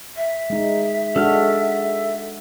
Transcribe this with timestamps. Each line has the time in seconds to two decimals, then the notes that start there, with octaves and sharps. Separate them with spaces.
0.16 E5
0.50 G#3 D#4
1.16 G#3 D4 F#4 A4 F6